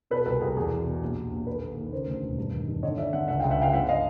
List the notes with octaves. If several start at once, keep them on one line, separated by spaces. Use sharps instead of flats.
B2 A4 B4
C2 A4 B4
C2 G#4 A#4
E2 G#4 A#4
B2
B2
A#1
A#1
A#1
D#2 A4 B4
D#2
D#2
C#3 A#4 C5
D2
E1
G2
D#3
G2
D3 C#5 D#5
D3 D5 E5
D3 E5 F#5
C#2 E5 F#5
F5 G5
C#2
E5 F#5
C#2 F5 G5
G1 E5 F#5
D#5 F5